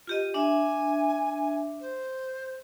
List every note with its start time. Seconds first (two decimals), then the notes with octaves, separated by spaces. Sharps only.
0.07 F4 G4 D#5
0.34 D4 E5 G#5
1.81 C5